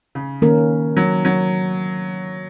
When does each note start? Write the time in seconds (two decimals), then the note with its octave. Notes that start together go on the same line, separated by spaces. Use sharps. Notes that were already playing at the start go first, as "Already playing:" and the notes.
0.15 C#3
0.42 D#3 A#3 C#4 A#4
0.97 F#3
1.25 F#3